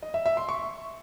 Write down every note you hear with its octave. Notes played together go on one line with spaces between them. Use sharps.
D#5
E5
E5
C6
C#6